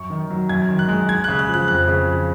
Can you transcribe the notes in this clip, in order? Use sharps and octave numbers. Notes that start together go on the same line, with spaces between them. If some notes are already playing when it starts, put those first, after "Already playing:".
Already playing: F#2 C#6
D#3
F#3
F#2 G#6
D#3
F#6
G#3
G#3 G#6
C#3 F#6
F#6
F3
F#6
F2 F#6
C#3
F3